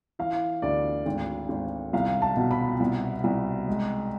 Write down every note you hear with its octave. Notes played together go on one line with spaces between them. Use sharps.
E3 F5
D2 D5
G#1
G#1
C2 F5
A5
B2
B5
C2
C2
G#3